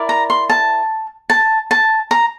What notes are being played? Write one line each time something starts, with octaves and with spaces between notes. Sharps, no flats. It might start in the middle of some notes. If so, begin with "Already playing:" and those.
Already playing: E4 A#4 D5
A#5
C6
A5
A5
A5
A#5